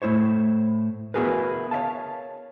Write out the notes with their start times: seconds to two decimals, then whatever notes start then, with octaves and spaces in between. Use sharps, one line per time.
0.02 A2 A3 E4 C5 C#5
1.14 B3 E4 F#4 G#4 A#4 B4
1.71 C#5 E5 F5 A5